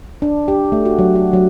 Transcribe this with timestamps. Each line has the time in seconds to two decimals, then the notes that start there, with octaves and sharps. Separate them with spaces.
0.22 D4
0.48 G4
0.72 A3
0.85 F#4
0.99 F#3
1.15 F#4
1.33 F#3